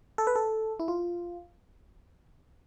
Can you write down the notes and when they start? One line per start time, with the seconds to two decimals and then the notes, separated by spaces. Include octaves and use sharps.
0.18 A4
0.27 B4
0.36 A4
0.80 E4
0.88 F4